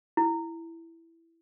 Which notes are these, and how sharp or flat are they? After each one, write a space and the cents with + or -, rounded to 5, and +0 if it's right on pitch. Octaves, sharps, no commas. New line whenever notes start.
E4 +5